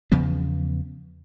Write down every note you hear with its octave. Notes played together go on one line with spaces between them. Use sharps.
E2 C#3 F3 B3